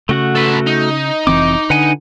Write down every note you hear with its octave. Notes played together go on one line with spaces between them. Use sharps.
C#3 A3 F#4 F#5
A4 B4
D#4
F1 E3 C4 D6
D3 B4 F#5 G#5